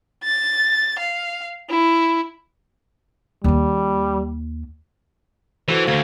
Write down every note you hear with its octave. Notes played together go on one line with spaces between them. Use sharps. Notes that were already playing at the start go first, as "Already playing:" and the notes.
A6
F5
E4
D#2 G3 A#3
E3 F#4 A4 C5
D2 F5 G#6